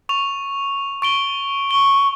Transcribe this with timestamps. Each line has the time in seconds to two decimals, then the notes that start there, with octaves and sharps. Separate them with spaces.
0.09 C#6 F7
1.02 C#6 D7 G7
1.71 C#6 G7